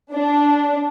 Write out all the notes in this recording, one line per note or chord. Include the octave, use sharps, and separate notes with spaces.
D4